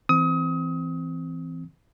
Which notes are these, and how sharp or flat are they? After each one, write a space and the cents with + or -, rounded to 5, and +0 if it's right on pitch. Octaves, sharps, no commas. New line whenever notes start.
E3 +0 C4 -10 D#6 +30